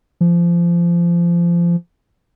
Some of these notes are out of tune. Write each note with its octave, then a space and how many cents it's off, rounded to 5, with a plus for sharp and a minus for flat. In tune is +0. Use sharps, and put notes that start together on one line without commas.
F3 -25